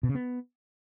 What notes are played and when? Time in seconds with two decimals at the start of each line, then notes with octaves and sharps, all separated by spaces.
0.03 B2
0.09 C#3
0.15 B3